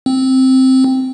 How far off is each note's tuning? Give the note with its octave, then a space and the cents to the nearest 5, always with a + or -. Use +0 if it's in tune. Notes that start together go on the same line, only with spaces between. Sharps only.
C4 +0